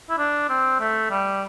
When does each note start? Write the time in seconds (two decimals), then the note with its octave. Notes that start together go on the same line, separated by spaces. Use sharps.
0.10 E4
0.18 D4
0.50 C4
0.80 A3
1.11 G3